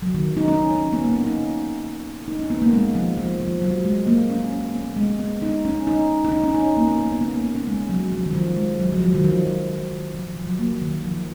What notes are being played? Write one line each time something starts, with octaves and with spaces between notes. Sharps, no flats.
F#3
D#3
D#4
C#4
C#4
B3
A#3
C#4
D#4
D#4
C#4
B3
A#3
G#3
F3
F3
F3
F#3
G#3
A#3
C#4
C#4
B3
G#3
B3
D#4
C#4
D#4
D#4
C#4
C#4
D#4
C#4
A#3
B3
A#3
C#4
B3
A#3
B3
C#4
G#3
F#3
F3
D#3
F3
G#3
F#3
F3
F#3
D#3
F3
F3
F3
D#3
F3
F3
F#3
A#3
F3
D#3
F3